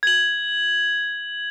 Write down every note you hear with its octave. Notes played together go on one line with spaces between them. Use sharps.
G#6 F#7